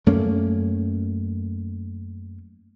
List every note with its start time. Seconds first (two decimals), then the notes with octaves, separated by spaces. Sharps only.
0.06 F#2 A3 A#3 C#4